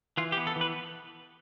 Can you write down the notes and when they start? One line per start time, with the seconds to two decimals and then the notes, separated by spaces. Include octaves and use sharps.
0.17 E3 F4
0.32 G4
0.37 B3
0.47 A4
0.56 E3
0.61 B4